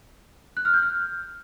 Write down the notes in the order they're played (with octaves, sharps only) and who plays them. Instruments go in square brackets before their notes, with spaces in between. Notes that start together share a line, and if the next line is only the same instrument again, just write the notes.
[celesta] F#6
F6
G6
F6